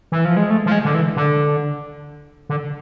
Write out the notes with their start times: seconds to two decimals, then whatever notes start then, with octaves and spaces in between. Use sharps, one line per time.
0.12 E3
0.25 F3
0.37 G#3
0.50 A3
0.66 F3
0.72 G#3
0.85 D3
0.94 E3
1.16 D3
2.49 D3